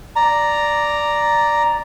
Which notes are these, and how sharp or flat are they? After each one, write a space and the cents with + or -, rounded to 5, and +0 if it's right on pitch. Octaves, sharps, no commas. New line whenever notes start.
D5 +0 A#5 +0